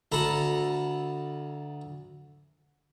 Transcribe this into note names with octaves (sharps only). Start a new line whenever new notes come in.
D2 A4 A#5 B5